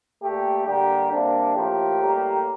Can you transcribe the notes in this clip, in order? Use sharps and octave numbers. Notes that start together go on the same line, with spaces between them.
A#2 A3 G4
D3 G3 A#3 G4
C3 G3 A#3 D4
A2 F3 A#3 G4
A2 G3 A#3